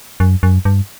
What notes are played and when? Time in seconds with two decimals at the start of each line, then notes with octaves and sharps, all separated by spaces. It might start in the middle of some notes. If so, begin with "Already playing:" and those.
0.20 F#2
0.43 F#2
0.65 G2